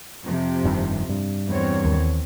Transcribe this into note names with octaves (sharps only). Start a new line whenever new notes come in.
F2 C3 F3
F1 G2 D#3
G2
E2 C4 C#5
D#2